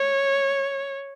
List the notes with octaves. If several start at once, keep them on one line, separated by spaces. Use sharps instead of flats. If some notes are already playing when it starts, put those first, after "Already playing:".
Already playing: C#5